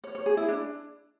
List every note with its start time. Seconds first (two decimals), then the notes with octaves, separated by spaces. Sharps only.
0.04 C#5
0.15 C#5
0.26 G#4
0.37 E4
0.48 D4